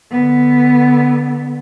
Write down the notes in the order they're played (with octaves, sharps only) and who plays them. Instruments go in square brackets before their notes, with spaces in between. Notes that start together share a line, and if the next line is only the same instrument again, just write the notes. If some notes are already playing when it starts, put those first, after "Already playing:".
[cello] D3 B3